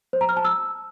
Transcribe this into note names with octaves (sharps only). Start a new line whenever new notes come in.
C5
A#5
F6
A5
E6